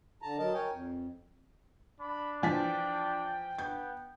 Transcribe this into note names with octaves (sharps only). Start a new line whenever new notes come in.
D3 A5 A#5
F#3 A#4 D#5 A5
A#4 C#5 G5 G#5
F2
D4 B5
E3 F3 G5 B6
B3 G6